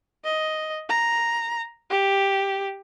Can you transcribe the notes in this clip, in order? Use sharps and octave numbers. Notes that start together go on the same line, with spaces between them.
D#5
A#5
G4